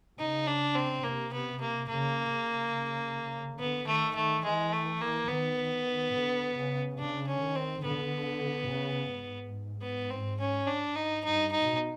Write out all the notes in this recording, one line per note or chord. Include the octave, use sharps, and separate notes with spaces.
C#3 D#4
D4
C4
C3 A#3
B3
A#3
C#3 A#3
C#3
D3 B3
D#3 A3
D#3 A3
E3 G#3
A3
A#3
D#3 B3
D3
C#3
C#3 D4
C#4
D#3
C4
D3 B3
C#3
G#2
B3
C4
C#4
D4
D#4
G2 D#4
D#4
B2